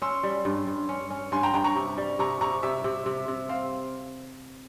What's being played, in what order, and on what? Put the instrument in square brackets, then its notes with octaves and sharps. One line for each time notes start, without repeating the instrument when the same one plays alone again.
[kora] C#4 [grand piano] C6 E6
[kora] G3
G2
G2
C#4
C#4
[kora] G2 [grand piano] G#5 C6
[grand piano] G5 A#5
[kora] G2 [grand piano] G5 A#5
[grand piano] A#5 C#6
[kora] C3
G3
[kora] C3 [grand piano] A#5 C#6
[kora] C3 [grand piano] A#5 C#6
[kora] C3 [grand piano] E5
[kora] C3
C3
C3
[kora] C4 [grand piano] F5